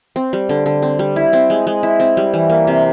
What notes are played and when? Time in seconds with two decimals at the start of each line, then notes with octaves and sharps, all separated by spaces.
0.16 C4
0.33 G3
0.49 D3
0.66 D3
0.82 C4
0.99 G3
1.16 E4
1.33 C4
1.50 G#3
1.67 G#3
1.83 E4
2.00 C4
2.17 G3
2.34 E3
2.50 A#3
2.67 C3